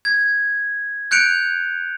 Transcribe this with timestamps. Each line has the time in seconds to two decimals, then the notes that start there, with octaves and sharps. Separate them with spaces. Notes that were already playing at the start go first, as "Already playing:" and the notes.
0.05 G#6
1.11 F#6 G6 C#7 D7 F7